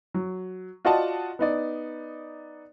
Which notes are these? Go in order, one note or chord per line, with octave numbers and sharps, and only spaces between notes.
F#3
F4 F#4 D5 D#5 F#5 A5
B3 D#4 D5